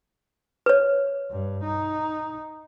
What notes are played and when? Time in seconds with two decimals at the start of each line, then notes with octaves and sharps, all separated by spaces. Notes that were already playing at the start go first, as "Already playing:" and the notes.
0.66 B4 C#5
1.31 G2
1.63 D#4